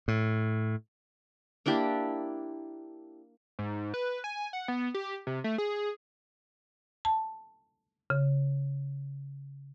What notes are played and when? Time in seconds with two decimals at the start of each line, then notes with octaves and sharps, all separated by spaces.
0.08 A2
1.66 A#3 D4 E4 G4
3.59 G#2
3.94 B4
4.24 G#5
4.53 F#5
4.68 B3
4.94 G4
5.27 C3
5.44 A3
5.58 G#4
7.05 A5
8.10 C#3